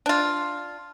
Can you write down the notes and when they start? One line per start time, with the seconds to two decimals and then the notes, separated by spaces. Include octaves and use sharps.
0.06 D4 F4